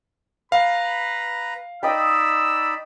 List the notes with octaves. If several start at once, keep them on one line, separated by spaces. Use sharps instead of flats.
B4 F5 A#5 B5
D#4 D5 D#5 G5 B5 E6